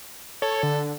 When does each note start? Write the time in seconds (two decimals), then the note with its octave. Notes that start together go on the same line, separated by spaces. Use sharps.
0.42 A4 C#5
0.63 D3